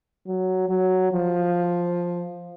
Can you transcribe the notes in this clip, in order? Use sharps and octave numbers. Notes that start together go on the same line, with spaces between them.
F#3
F#3
F3